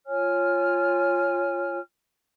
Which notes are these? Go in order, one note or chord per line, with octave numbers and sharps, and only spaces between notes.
F4 C#5 G#5 F6